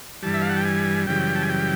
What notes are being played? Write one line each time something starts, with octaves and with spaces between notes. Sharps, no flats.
G2 E3 G3 A5
E5
F5
F#5
G5
G#5
F#2 C#3 E3 G3 G5
A5
G#5
G5